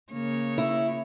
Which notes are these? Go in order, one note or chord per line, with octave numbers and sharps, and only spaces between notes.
C#3 A#3 C#5
E4